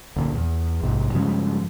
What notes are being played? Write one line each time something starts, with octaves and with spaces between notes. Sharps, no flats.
D2 A#2
E2
A#1 G#2 C3
G2 C#3 F3 G#3